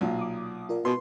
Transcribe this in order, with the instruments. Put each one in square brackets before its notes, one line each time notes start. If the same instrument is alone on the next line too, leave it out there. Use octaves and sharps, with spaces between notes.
[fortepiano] B1 A#2
[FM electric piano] D6 D#6
F4 A#4 D5
[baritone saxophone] B2 [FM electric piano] B4 [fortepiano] C6